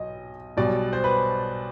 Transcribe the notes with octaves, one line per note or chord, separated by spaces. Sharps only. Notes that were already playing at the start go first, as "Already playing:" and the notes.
Already playing: B1 B2 D#5
B1 B2 G3 D5
C5
B4